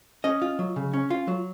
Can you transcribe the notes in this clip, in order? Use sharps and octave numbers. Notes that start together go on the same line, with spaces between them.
C#4 D#5
F4
F#3
C#3
C#4
F4
F#3